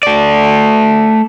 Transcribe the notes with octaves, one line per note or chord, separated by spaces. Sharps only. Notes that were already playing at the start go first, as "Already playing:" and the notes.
A3 D5